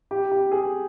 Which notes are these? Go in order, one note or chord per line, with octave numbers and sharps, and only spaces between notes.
G4
G4
G#4